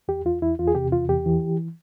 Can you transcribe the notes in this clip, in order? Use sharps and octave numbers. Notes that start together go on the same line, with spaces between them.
E2 G4
E2 F4
E2 E4
E2 F4
G#4
C3 G4
E2 F4
E2 G4
E3